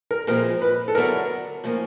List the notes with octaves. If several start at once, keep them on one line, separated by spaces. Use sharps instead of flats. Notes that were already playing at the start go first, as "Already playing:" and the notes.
A#4
A#2 F3 G#3 C4 E4 A#4
B4
A4
D3 F#3 B3 E4 G#4 A#4
A2 F3 A#3 C#4